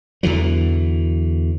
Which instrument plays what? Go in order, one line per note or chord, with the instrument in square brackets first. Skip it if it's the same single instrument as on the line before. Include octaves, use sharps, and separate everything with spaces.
[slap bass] E2 D3 E3 F#3